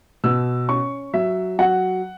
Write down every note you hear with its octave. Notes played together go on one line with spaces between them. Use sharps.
B2 E6
C#4 C#6
F#3 E5
F#3 F#5